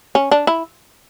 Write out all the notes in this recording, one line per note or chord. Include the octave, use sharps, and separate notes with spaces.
C#4
D4
E4